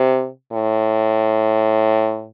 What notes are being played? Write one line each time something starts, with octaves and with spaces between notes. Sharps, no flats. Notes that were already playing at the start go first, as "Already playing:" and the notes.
Already playing: C3
A2